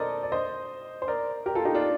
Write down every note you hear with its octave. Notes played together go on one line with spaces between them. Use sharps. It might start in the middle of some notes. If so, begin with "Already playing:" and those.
Already playing: A4 A#4 C5 D5 D#5
D5
C5 D#5
C5
A#4 D5
G4 A#4
F4 A4
D#4 G4
D4 F4